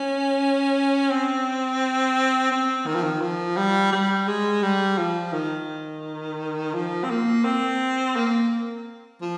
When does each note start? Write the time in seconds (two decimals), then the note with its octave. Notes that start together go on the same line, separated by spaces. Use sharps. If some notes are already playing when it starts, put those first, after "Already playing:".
Already playing: C#4
1.11 C4
2.51 C4
2.86 D#3
2.95 F3
3.04 D#3
3.22 F3
3.57 G3
3.93 G3
4.28 G#3
4.63 G3
4.98 F3
5.33 D#3
6.74 F3
7.04 C4
7.10 A#3
7.45 C4
8.16 A#3
9.22 F3